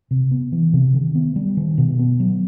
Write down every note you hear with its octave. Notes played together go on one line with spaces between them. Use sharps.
C3
B3
E3
C3
D#3
B3
G3
D#3
B2
B3
F#3